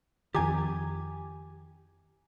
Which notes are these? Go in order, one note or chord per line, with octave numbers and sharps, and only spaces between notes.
F2 D#3 E4 G4 G#5 D6